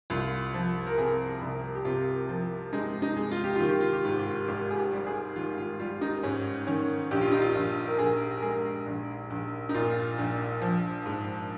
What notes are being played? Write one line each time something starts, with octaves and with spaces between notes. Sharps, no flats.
C2 F4
F3
A#4
C3 G#4
C2
G4
C3 F4
F3
G#3 D#4
D#4
G#3
F4
G4
D#3 F4
G4
F4
G4
G#2 F4
G4
F4
G#1 G4
G#4
G4
G3
G#4
D#3 F4
F4
G3 F4
D#4
G#2 C#4
D#3 C#4
A#1 G4
F4
D#4
F4
A#1
A#4
A#1 G#4
A#4
G#3 G#4
A#1
A#1
D#4
A#2 F4
A#1
F3
G#2